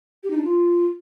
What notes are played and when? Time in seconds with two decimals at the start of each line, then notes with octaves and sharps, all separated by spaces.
0.24 G4
0.30 D#4
0.37 D4
0.44 F4